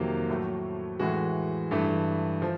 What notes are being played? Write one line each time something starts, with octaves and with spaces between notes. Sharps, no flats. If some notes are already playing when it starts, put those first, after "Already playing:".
Already playing: F2 C3 D#3 F#3 A#3
A2 F#3 A3
A2 E3 G#3 F#4
G2 E3 A3
F3